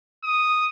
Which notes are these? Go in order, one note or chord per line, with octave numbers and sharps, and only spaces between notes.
D#6